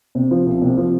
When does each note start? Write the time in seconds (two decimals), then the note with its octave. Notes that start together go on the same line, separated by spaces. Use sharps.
0.15 C3
0.31 F3
0.46 C2
0.62 C3
0.77 F3